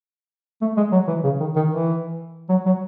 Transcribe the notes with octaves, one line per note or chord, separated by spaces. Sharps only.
A3
G#3
F#3
E3
C#3
D#3
D#3
E3
F#3
F#3